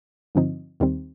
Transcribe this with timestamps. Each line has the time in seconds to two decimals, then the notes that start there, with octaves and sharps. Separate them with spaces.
0.35 G2 D3 F3 C4 D#4
0.80 D#2 D#3 G3 C4